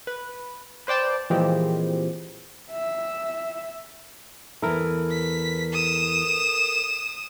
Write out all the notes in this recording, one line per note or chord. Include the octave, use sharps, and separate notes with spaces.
B4
B4 C5 D5 G5 A5
A#2 E3 F3 G#3 C4 G4
E5
E2 E3 E4 A4 A#4
B6
D#6 E7